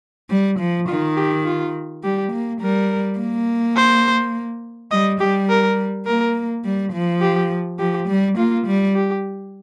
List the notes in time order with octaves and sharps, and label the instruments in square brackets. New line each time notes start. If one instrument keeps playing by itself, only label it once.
[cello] G3
F3
[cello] D#3 [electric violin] F4
[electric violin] G4
F4
[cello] G3 [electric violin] G4
[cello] A#3
[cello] G3 [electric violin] A#4
[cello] A#3
[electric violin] C5
[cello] G3 [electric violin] D#5
[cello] G3 [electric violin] G4
[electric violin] A#4
[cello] A#3 [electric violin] A#4
[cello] G3
F3
[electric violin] G4
[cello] F3 [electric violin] G4
[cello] G3
[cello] A#3 [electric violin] F4
[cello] G3
[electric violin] G4